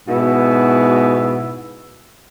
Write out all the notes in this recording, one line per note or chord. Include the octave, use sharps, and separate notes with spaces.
G#2 B2 B3 E4 F#4